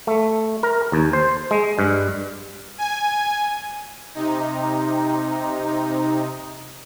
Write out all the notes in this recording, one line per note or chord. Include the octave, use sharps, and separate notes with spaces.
A3
A#4
D#2
C5
G#3
G2
G#5
C3 D#4